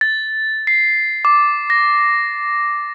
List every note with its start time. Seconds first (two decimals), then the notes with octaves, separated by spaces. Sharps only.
0.01 A6
0.67 C7
1.25 D6
1.70 A#6